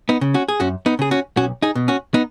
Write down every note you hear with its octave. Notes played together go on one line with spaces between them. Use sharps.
B3 D#4
C#3
C#4 F#4
G#4
F#2 C#4 F#4
B3 D#4
C#3 G#4
C#4 F#4
B1 C#4 F#4
D#4 G#4
B2
C#4 F#4
B3 D#4